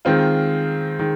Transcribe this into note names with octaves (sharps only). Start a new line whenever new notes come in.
D#3 G#3 C4 F4
D#3 G#3